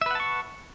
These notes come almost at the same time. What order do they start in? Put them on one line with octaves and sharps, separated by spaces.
E5 B4 F#5 A5 C#6